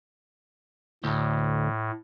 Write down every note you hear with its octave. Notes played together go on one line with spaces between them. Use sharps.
D2 A2